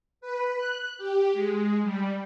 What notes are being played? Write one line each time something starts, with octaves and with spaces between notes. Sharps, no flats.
B4
F#6
G4
G#3
G3